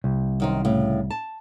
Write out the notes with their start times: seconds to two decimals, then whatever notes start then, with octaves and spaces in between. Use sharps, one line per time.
0.04 C2
0.40 F#2 D#3 C5
0.65 A2 C#3
1.10 A5